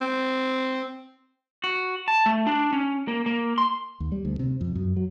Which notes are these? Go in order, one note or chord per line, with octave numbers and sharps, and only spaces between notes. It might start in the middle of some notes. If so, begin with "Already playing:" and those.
C4
F#4
A5
A3
D4
C#4
A#3
A#3
C6
D#2
G3
D2
C3
F2
F#2
F#3